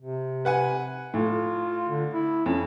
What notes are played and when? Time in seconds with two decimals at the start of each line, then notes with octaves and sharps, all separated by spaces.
0.01 C3
0.45 B4 F#5 G#5
1.14 A2 F4
1.89 D3
2.13 E4
2.46 F2 C#4